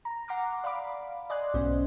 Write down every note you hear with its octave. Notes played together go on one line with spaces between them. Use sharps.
A#5
F#5 A#5 C6 D6 F6
D5 F5 B5 D6
D5 D#5 G#5 C6 F#6
B1 G#2 B3 C#4 C5